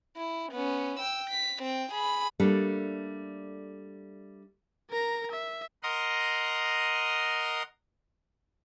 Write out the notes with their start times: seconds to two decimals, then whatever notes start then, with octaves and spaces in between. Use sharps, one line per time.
0.17 E4
0.52 B3 C#4
0.99 G5 E6
1.30 B6
1.62 C4 G5
1.92 G#4 B5
2.40 G3 A3 A#3 D4 A4
4.91 A#4 A#5
5.31 E5
5.83 A#4 D#5 F#5 A#5 C6 D#6